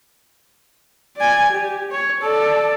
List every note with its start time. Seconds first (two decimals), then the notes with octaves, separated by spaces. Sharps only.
1.17 D5 G#5
1.50 G4
1.91 C#5
2.22 A4 D5